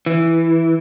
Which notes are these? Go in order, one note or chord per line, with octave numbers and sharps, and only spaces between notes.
E3